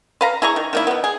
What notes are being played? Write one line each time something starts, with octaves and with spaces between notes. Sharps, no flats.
B4 F5 A#5
E4 G#4 A#5 C#6
D#3
D#3 A#3 E4
B2 B3
G#4